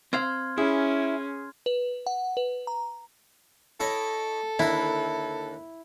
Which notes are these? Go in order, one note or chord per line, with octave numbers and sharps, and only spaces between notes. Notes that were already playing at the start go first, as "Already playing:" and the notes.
C4 C5 F5 C6 F6 G#6
C#4 E4 G#4
B4
F#5
B4
A#5
E4 A4 C#5 D#5
D#2 D3 E4 A#5